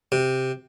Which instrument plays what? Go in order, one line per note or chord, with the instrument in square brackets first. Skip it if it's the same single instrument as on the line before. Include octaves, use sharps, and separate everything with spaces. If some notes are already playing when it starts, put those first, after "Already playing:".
[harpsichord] C3